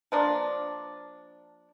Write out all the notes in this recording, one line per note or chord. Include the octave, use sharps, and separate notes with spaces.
F3 A#3 D4